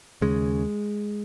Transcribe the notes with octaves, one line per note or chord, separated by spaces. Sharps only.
D#2 C#3 G#3